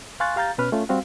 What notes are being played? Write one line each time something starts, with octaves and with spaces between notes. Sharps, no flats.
F5 G#5 C6 C#6 F#6 A6
G4 F5 A#5 G6 A6
B2 C#4 B4 F6
A3 C#4 F4
G3 C4 F#4 F5